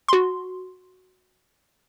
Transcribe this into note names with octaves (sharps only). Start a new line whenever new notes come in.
F#4 C6